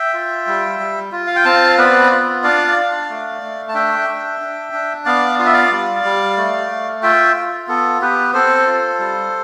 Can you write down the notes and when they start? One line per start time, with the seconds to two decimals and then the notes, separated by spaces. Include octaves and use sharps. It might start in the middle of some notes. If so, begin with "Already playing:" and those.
Already playing: E5 G5
0.14 F4
0.47 G3
0.80 G3
1.12 F4
1.27 F5
1.36 G5
1.45 C4 F5 A5
1.78 B3 B4 D5
2.11 F4
2.43 D4 D5 F5
2.77 D4
3.10 A3
3.42 A3
3.69 A5
3.74 D4 E5 G5
4.08 D4
4.41 D4
4.73 D4
5.05 B3 D5 F5
5.39 F4 F5
5.46 E5
5.53 D5 F5
5.71 G3
6.04 G3
6.37 A3
6.70 A3
7.02 F4 E5 G5
7.35 F4
7.68 B3 A4
8.01 B3 G4 B4
8.33 C4 A4 C5
8.67 F4
8.99 G3